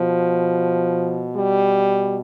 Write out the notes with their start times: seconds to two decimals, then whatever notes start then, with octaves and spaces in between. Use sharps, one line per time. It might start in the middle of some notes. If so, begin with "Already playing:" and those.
Already playing: B2 F3
1.34 G3